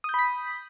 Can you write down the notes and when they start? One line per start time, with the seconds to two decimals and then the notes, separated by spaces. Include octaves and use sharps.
0.04 D#6
0.09 G6
0.14 B5
0.19 B6